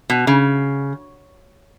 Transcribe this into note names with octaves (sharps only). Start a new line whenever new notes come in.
B2
C#3